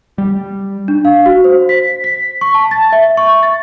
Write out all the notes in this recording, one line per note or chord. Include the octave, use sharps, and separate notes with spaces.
G3
D4
F5
F#4
C5
B6
B6
C#6
A5
A6
E5
C#6
A6